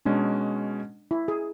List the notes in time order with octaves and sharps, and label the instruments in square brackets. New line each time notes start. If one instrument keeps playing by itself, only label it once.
[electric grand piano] B2 G#3 C#4 [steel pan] D4
[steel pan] E4
G#4